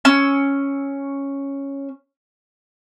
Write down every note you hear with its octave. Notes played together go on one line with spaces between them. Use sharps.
C#4 E6